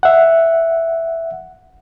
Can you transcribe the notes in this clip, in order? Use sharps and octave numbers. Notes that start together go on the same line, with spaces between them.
E5 F#5